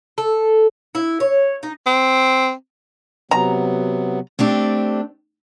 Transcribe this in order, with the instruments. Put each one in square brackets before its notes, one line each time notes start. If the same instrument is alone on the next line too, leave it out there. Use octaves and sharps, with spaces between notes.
[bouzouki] A4
E4
C#5
D#4
[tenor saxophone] C4
[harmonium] C3 F#3 B3 [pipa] A#5
[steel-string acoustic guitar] A3 C4 D4 G4